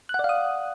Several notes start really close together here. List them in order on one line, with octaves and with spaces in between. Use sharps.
F#6 F#5 D5 F5 D#6